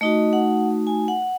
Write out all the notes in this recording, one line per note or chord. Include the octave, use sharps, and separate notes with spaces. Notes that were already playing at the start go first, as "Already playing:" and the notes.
A3 D#4 F#4 D#5
F#5
G#5
F#5